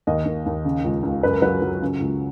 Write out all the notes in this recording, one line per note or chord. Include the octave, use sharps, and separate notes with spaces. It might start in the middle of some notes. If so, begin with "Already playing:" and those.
D#2 D#5
D#2
D#2
C#3
C#2
C#2
F#2 B4
A#4
F#3 B4
F#3
C#3
C#2